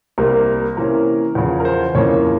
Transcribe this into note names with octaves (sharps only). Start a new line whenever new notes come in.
C2 C3 G3 A#3 A#4
C3 E3 A#3 C#4 A#4
E2 C#3 F3
A#4
C5
F2 C#3 E3 A#3 C#4 C#5